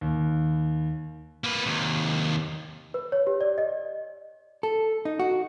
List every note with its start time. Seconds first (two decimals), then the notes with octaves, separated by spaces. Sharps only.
0.01 D#2
1.44 A#3 B4
1.66 D#2 C3
2.94 B4
3.12 C#5
3.27 G4
3.41 D5
3.58 D#5
4.63 A4
5.05 D#4
5.20 F#4